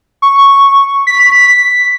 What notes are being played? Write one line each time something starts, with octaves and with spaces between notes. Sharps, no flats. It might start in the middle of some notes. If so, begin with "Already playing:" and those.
C#6
B6